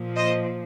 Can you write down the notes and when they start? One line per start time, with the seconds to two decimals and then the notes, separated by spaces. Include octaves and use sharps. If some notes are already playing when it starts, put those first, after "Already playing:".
Already playing: A#2 F3
0.17 C5 D#5